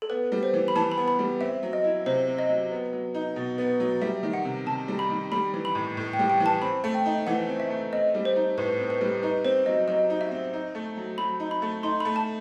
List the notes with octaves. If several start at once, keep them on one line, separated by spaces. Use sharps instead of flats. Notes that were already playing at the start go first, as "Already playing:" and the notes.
A4
B3 B4
G3
C5
E3
B5
E3 A5
B5
B3
B5
G3
C4 E5
F#3
D#5
E4
C3 C5
C4
D#5
F#3
B3
F#3
D#4
B2
B3
F#3
G3 E5
D#3
F#5
C3
C3 A5
G3
B5
D#3
G3 B5
E3
B5
A2
A2
G5
G3
G5
E3
A5
C4 B5
A3
G5
D#4
E3 F#5
C4
E5
A3
C4 D#5
G3
C5
D#4
A2 B4
C4
B4
G3
D#4 B4
C4 C5
F#3 D#5
F#3 D#5
D#4
E5
C4
D#4
A3
F#3
F#3 B5
D#4
B5
A3
D#4 C6
A3 B5
A5